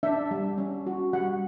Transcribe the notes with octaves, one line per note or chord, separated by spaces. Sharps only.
D4 E5
G3
C#4
F#4
G3 F#5